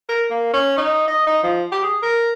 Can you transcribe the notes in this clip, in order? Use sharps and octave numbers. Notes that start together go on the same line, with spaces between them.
A#4
A#3
C#4
D#4
D#5
D#4
F3
G4
G#4
A#4